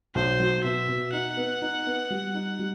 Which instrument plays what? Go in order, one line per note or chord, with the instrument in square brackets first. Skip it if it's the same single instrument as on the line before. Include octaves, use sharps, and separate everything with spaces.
[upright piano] B1 [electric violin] C5
[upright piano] F#3
[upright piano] B2 [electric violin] E5
[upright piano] B2
[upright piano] D#4 [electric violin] F#5
[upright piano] B3
D#4
B3
G3
D#4
G3